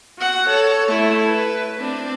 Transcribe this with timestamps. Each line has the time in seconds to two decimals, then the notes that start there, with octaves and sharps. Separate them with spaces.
0.19 F#4 F#5
0.48 A4 C#5
0.87 A3 E4
1.29 B4
1.78 C4 D4